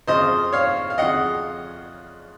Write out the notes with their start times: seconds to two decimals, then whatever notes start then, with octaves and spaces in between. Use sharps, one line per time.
0.07 F2 C#3 F3 C5 D#5
0.53 C#5 F5
0.90 F5
0.98 F2 C#3 F3 D#5 F#5